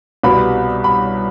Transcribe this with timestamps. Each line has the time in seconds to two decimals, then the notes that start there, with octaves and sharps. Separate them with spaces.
0.23 C2 B2 G3 B5
0.84 B5